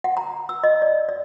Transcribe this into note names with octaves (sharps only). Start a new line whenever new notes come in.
F#5
A#5
E6
D#5
D5
D5